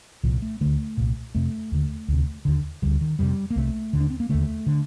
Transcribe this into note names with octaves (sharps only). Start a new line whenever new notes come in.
C2 A#2 F3
A3
D2 D3 A3
C2 A#2
F2 C3 A3
D#2 D3
D2 C3
D#2 D3
D2 D3 G3
D#3
F2 C3 G3
A#3
C2 C3 A3
D#2 D3
D4
C4
A#3
D#2 D3 A3
D3